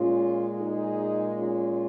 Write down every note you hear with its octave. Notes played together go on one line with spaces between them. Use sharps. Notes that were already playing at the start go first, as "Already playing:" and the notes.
Already playing: A#2 G#3 C#4 F4
D#4 G#4
C#4 F4